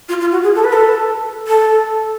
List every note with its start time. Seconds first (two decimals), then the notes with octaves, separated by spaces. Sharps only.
0.09 F4
0.21 F4
0.32 F#4
0.43 G#4
0.55 A4
0.64 B4
0.73 A4
1.47 A4